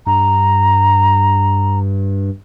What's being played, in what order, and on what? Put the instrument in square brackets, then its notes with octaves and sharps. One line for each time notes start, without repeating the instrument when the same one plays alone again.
[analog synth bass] G2 [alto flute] A#5